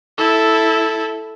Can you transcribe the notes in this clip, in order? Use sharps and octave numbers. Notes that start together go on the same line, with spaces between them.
E4 A4